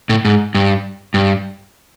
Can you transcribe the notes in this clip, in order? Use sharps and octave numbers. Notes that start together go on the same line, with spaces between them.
A2
G#2
G2
G2